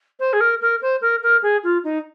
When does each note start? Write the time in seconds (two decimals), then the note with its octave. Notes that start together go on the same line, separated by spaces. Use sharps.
0.20 C5
0.33 G#4
0.41 A#4
0.61 A#4
0.82 C5
1.01 A#4
1.23 A#4
1.42 G#4
1.64 F4
1.84 D#4